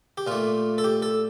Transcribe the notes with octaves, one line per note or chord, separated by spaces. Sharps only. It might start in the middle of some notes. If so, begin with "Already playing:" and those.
G4
A#2 A3 F4
A4
G4
A4